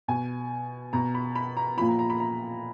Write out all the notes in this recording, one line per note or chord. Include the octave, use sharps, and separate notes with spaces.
B2 G#5
B2 A#5
B5
B5
A#5
A#2 F3 B5
A#5
A#5
B5
A#5